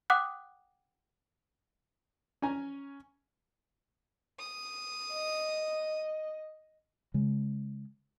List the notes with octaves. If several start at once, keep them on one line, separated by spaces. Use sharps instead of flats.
F#5 G5 D6 D#6 F#6
C#4 G#5 A#5
D#6
D#5
C#3 G#3